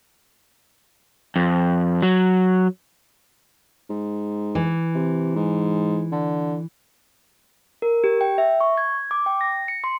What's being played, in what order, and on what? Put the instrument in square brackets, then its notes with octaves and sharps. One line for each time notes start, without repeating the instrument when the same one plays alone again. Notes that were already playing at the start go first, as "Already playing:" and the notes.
[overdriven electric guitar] F2
F#3
[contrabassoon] G#2
[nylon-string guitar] E3
[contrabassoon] C3
G#2
D3
[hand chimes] A#4
G4
G5
E5
C#6
G#6
D6
G5
A#6
C#7
C6